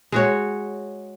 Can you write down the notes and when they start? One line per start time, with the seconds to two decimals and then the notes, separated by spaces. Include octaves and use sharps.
0.12 G#3 F#4 C#5